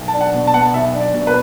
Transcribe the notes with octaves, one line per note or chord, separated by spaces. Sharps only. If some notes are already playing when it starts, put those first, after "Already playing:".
Already playing: B1
A5
D4
F#5
B2
A5
B3 F#5
A5
B1 E5
D4
D5
B2
B4